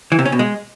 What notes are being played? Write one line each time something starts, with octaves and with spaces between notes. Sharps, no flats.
E3
C3
C#4
B2
G#3